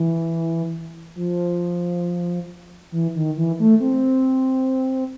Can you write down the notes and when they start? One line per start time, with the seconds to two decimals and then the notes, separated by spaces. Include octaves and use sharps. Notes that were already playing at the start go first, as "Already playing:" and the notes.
Already playing: E3
1.15 F3
2.92 E3
3.15 D#3
3.37 E3
3.59 A3
3.80 C4